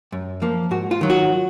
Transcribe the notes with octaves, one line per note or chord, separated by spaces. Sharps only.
F#2
F3 A#3
G#2 F#4
F4
D#3 F#3
F#4